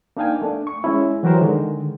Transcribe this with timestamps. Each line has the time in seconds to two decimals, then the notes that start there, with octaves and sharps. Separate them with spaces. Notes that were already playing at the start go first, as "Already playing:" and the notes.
0.17 A#3 D4 D#4 F5 G5 G#5
0.42 A3 D4
0.67 C#6
0.84 G#3 C#4 E4
1.23 E3 F#3 F#4 G4 A#4 C5
1.41 D3 D#3 G#3